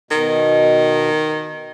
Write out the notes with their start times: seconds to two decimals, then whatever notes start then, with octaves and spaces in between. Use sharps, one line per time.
0.11 B2 D#3